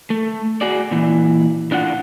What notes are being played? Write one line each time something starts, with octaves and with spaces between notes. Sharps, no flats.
A3
F#4 G#4 D5
A#2 E3
A2 D4 F4 D#5 F#5